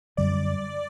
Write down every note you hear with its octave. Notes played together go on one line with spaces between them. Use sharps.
F#2 D3 G3 D5